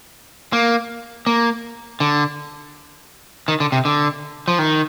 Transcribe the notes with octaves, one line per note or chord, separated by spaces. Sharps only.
A#3
A#3
D3
D#3
D3
C3
D3
F3
D#3